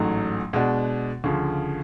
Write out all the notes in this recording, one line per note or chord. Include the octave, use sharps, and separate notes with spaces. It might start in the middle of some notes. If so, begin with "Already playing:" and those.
Already playing: A1 G#2 F#3 A3
B2 G#3 D4 F#4
D2 C#3 F3